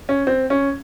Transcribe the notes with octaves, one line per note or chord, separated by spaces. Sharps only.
C#4
C4
C#4